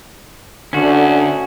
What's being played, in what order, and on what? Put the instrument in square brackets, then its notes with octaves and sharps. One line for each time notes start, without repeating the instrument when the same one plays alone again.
[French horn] D2 [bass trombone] D3 [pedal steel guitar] C#4 F#4